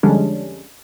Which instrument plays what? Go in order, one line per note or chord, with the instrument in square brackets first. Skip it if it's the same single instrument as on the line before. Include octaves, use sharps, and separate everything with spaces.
[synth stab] F2 D3 G3 G#3 C#4 D4